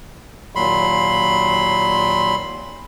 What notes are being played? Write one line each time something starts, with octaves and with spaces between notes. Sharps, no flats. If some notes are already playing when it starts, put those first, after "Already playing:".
D#2 A#2 F#3 B5 C6